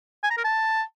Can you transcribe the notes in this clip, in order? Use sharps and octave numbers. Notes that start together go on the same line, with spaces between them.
G#5
A#5
A#4
A5